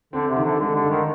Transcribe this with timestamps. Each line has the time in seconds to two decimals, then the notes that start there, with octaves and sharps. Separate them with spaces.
0.13 D3 C4
0.29 C3
0.37 D#3
0.44 D3
0.60 D3 G#3
0.75 D3
0.83 G2
0.90 D#3